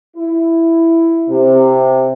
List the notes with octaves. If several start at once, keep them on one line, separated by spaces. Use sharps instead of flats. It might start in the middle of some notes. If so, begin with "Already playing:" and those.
E4
C3